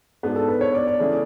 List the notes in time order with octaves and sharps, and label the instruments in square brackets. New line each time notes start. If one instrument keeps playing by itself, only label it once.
[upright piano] G#2 G#3 B3 D4 F#4
[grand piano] A4
B4
C#5
D5
D5
[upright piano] C#3 E3 A3 C#4 G#4